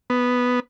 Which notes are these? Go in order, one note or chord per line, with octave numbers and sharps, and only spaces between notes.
B3